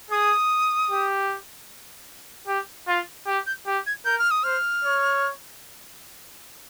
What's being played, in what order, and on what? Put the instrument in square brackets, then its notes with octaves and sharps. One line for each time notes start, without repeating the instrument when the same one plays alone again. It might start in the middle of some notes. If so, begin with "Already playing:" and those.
[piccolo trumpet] G#4 [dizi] D#6
[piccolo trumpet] G4
G4
F4
G4
[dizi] G6
[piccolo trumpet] G4
[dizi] G#6
[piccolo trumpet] A#4 [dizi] G6
[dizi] F6
D#6
[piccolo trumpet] C5 [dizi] F6
[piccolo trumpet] C#5